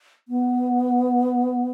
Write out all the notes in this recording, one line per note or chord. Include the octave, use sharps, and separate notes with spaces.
B3